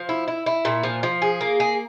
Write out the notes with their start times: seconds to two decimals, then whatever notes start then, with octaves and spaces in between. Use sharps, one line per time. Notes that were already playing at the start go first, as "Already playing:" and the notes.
Already playing: F3
0.09 E4
0.28 E4
0.46 E4
0.65 A#2
0.83 F3
1.03 F3
1.22 G#4
1.41 A#3
1.60 G#4